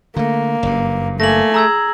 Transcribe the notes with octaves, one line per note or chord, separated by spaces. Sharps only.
D3 A3 A#3
F#1 G2
A3 A#3 G#5 A#6 F#7
G#4 A#5 E6 G#6